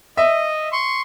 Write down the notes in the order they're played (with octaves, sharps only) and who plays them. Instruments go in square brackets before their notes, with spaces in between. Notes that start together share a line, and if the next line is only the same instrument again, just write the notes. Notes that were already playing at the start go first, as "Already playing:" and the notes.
[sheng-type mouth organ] D#5 [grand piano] E5
[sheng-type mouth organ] C6 C#6